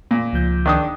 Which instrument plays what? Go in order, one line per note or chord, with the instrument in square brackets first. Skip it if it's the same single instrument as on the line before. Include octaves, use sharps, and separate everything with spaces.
[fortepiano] A#2
[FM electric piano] C#2 F3 G6
[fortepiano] D#3 D4 D#6